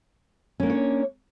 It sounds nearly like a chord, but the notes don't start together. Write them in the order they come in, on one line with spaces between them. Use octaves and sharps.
C#4 A#3 D4 C#5